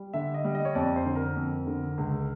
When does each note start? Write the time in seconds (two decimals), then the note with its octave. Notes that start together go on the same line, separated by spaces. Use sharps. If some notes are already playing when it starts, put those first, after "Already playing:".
Already playing: G3
0.13 D3 E5
0.34 D#5
0.44 G3
0.55 D#5
0.65 C#5
0.75 F2 D5
0.96 C5
1.05 D3
1.15 A#4
1.36 F2
1.67 D3
1.98 C#2